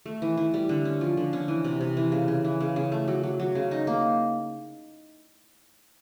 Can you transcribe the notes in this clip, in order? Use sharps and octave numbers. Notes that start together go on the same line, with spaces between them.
A3
E3
E3
G3
D3
C#4
F3
D3
C#4
E3
C3
C3
E3
C#3
C#3
E3
C#3
C#3
A3
F#3
F#3
F#3
C#3
D#4
A#3